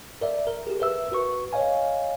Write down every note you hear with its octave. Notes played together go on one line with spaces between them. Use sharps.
A#4 D5 E5
A#4
G4 G#4
A#4 B4 E5 E6
F#4 B4 C#6
C#5 D#5 F5 G#5